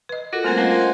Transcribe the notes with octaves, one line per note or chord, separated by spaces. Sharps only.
B4 D#5
F4 F#4 A4 A#4
G3 A3 A#3 C4 B4 C5 F#5 G#5
A#3 C#4 F4 A4 A#4 D#5